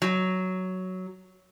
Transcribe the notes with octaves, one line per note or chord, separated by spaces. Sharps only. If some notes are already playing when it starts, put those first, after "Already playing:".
F#3